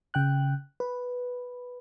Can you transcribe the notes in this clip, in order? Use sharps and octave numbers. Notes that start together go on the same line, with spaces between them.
C#3 G5 F#6
B4